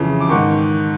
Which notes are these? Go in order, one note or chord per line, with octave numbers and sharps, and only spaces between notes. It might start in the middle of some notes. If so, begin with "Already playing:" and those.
Already playing: F2 C#3 E3
D6
G#2 D#3 C#6